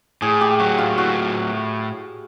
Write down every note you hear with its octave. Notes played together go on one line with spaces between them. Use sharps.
A2 G#4
G4
F#3 F#4
F4
A2 F#4